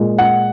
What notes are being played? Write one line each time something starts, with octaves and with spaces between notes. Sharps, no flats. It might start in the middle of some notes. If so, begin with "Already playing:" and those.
Already playing: A#2 G#3
F#5